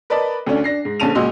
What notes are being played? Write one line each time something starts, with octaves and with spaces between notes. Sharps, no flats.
A#4 B4 D5 D#5 A5 B5
D2 A3 C#4 D4
D4 A#6 C7
G#2
A#1 D3 C#4 A5 D#7 F7
C#2 A#2 F#4 D#5 C6 E6